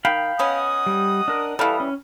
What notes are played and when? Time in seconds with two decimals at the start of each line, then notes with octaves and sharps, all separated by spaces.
0.05 D#3 F5 G5 B5
0.39 B3 C#4 D#5 F#5 D#6
0.86 G3
1.28 D4 A#4
1.59 E3 G3 A4 F5
1.80 C#4